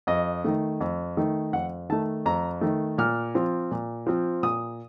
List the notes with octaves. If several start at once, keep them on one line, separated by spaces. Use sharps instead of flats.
F2 D#5
D#3 A3
F2
D#3 A3
F2 F#5
D#3 A3 A5
F2 A#5
D#3 A3
A#2 F6
F3 C4 F4
A#2
F3 C4 F4
A#2 D#6